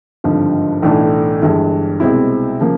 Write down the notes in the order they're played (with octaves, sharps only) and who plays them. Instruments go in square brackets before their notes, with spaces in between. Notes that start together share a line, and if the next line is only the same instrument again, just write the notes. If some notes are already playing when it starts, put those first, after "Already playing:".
[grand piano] G#1 G2 D3 F3
B1 A2 E3 A3 D4
G1 G2 E3 G#3
C2 B2 G#3 C4 E4
C#3 F3 A#3